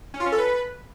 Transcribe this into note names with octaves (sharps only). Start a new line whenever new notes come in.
C#4
F4
C#4
A4
B4